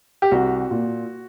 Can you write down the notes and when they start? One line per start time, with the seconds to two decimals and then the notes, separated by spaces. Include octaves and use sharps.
0.22 G4
0.31 C2 F#4
0.71 A#2